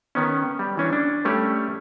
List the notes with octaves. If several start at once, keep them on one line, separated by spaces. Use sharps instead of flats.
D#3 B3 C#4
G3
E3 C#4 D4
D4
G3 A3 C#4 G4 D5